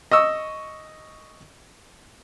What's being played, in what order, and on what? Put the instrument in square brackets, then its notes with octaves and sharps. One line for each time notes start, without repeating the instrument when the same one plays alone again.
[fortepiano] D#5 C#6 E6